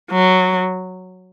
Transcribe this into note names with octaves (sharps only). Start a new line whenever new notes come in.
F#3